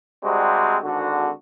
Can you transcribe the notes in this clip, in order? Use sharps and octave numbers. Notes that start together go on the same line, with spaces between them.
C3 G3 G#3 C4 D4 F#4
G#1 D3 F#4